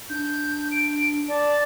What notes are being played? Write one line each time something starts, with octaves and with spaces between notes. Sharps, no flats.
D4 G6
D7
D5 A5